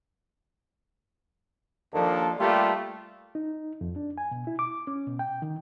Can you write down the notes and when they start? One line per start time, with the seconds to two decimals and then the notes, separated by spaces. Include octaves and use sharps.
1.94 D#2 F3 A#3 D4 A4
2.40 G3 A3 A#3 F4 G4
3.35 D#4
3.81 F2
3.96 D4
4.18 G#5
4.31 B2
4.47 E4
4.59 D6
4.87 C#4
5.07 B2
5.19 G5
5.42 D#3